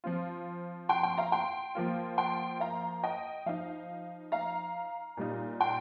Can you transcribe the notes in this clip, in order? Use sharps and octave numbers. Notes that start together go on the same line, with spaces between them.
F3 C4 F4
G5 C6
G5 C6
F5 A#5
G5 C6
F3 A#3 F4
G5 C6
F5 A#5
D#5 G5
F3 D#4 F5
F5 A#5
A#2 G3 D#4
G5 C6